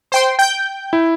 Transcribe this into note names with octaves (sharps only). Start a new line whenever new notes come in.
C5 G5 C6
G5 G6
E4